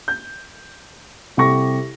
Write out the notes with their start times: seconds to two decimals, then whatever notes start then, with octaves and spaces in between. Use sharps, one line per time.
0.08 G6
1.37 C2 C3 G4 A4 C#6 A#6